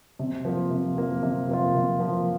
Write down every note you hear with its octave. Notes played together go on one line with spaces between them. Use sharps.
C3
F3 A#3 F4
C3
F3 A#3 F4
C3
F3 A#3 F4
C3
F3 A#3 F4